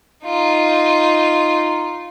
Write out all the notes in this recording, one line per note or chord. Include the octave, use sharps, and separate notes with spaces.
D#4 F4